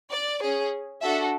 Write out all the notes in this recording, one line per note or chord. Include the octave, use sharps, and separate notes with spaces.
D5
C#4 G#4
D4 F#4 A4 E5